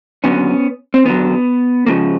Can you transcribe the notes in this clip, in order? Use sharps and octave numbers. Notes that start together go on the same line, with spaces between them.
D#2 D3 F#3 B3 C#4
C4
D#2 D3 F#3 B3
C#2 C#3 F3 G#3 A#3